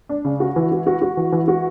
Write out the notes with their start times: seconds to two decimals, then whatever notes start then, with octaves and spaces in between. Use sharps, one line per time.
0.09 D4
0.25 C#3
0.40 F#4
0.56 E3
0.71 F#4
0.87 F#4
1.02 F#4
1.17 E3
1.32 E3
1.48 F#4